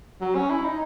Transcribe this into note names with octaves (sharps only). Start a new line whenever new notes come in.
F#3
C#4
E4
D#4